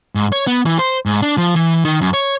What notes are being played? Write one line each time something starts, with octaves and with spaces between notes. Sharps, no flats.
G#2
C#5
B3
E3
C5
G#2
D4
F3
E3
D#3
F#2
C#5